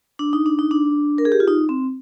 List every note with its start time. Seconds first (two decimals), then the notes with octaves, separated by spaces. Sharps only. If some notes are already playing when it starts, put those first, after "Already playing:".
0.19 D4
0.33 D#4
0.46 D4
0.59 D#4
0.71 D4
1.18 A#4
1.25 G#4
1.32 G4
1.40 F4
1.48 D#4
1.69 C4